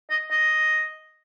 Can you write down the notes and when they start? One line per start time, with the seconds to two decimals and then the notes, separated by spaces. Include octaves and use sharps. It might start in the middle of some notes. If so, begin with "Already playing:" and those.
0.11 D#5
0.31 D#5